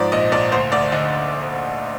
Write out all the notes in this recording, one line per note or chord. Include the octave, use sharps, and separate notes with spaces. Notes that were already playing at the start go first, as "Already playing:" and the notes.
Already playing: G#2 F3 D5
A#1 D#5
A#1 D5
D2 C5
D2 D5
D3 D#5